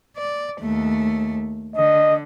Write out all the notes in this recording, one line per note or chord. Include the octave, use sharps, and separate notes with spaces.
D5
D#2 A3
D3 D#5